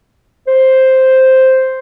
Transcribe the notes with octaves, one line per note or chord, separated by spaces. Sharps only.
C5